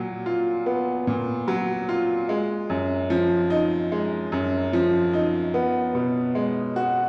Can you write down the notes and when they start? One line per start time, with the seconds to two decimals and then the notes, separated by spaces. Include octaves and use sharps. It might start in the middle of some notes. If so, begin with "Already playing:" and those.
Already playing: A#2 F#3
0.26 F4
0.66 B3
1.07 A#2
1.48 F#3
1.89 F4
2.29 G#3
2.70 F#2
3.10 F3
3.50 D#4
3.92 G#3
4.32 F#2
4.73 F3
5.13 D#4
5.54 B3
5.95 B2
6.35 G#3
6.76 F#4